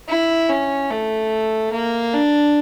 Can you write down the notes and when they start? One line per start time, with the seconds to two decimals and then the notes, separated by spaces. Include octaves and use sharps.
0.09 E4
0.49 C#4
0.91 A3
1.73 A#3
2.14 D4